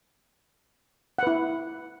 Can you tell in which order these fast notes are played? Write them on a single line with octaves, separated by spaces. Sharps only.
F#5 B4 E4